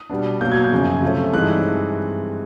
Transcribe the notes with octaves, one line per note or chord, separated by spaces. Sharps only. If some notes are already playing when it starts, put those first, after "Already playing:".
Already playing: D#6
B2 G3 B3 D4
B2 F#3 A#3 G6
G#6
G6
F#2 C#3 F3
C3 F3 A3 C#4
G2 E3 G#3 C4 D#4 F#6